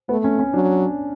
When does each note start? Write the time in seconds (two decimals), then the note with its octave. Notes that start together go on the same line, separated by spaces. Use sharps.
0.09 A3 B3
0.24 C#4
0.39 C#4
0.53 F#3 D4